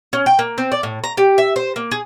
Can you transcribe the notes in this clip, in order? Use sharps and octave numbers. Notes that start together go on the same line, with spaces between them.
C#4
G5
A#3
C4
D5
A2
A#5
G4
E5
C5
A#3
G#4